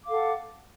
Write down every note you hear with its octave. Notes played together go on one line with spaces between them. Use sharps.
A4 F5 F#5 D6